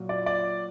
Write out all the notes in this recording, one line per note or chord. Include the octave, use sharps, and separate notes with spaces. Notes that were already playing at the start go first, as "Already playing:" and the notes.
Already playing: A#2 F#3
D5
D5